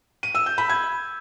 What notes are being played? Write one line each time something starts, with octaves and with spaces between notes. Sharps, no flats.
D#7
E6
G6
B5
G#6